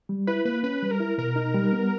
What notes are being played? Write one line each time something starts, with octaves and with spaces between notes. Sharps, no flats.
G3
E4 B4
A#3 B4
C#4 B4
G3
A#4
E4
B2 A#4
D#4
G3
B3